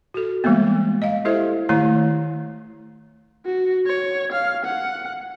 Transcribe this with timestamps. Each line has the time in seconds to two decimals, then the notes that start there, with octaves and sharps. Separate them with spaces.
0.14 F#4 A4
0.44 E3 G3 G#3 A#3 B3
1.02 D#5 F5
1.25 E4 G4 A4 C5 E5
1.69 D#3 A3 E4 C#5 A#5
3.46 F#4
3.86 C#5
4.32 F5
4.65 F#5